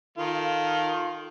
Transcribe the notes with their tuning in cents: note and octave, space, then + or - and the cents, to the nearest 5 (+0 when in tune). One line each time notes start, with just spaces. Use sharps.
D#3 +0 F4 +10 A4 +0